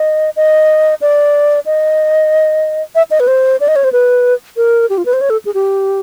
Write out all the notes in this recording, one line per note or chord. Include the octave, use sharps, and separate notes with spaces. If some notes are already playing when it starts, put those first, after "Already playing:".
Already playing: D#5
D#5
D5
D#5
E5
D#5
B4
C5
D5
D#5
C#5
C5
B4
A#4
G4
F4
B4
C5
C#5
A4
G#4
G4